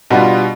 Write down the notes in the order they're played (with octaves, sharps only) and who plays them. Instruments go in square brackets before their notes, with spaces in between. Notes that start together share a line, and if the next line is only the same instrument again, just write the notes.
[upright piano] B2 G3 B3 D4 F4